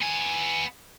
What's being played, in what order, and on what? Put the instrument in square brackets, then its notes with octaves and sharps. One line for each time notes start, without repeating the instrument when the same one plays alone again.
[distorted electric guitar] B3 G#5